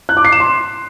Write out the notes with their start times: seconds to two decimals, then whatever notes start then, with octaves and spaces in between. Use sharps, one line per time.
0.09 F#6
0.17 D6
0.25 C7
0.32 E7
0.40 C6